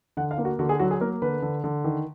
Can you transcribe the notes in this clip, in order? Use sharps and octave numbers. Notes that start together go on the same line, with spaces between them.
D3 F#5
F5
A#3
F#4
D3 F#4
G#4
F#3 F#4
G#4
A#3 A#4
D3 B4
D3
D3
D#3